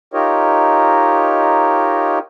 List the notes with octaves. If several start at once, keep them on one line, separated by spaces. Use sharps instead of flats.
D#4 F4 G4 A#4 C#5 D#5